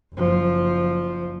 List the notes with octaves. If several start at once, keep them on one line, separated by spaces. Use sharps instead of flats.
F#1 F3